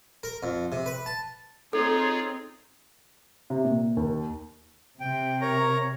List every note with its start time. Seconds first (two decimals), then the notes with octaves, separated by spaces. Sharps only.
0.23 A#4
0.43 F2
0.72 C3
0.86 B4
1.06 A5
1.73 C4 D#4 F4 G#4 A4 C#5
3.50 C3
3.64 A#2
3.97 D#2
5.00 C3 G5
5.41 A#4 C#5 A#5